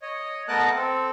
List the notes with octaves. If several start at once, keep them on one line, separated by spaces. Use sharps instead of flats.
C#5 D#5
A3 B3 A#4 D#5 A5 F#6
C4 A4